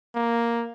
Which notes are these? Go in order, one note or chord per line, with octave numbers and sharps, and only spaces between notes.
A#3